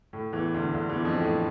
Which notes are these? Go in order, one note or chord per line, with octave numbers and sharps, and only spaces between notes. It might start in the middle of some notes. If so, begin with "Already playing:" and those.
A2
E2 E3
D2 D3
D2 D3
E2 E3
F2 F3
A2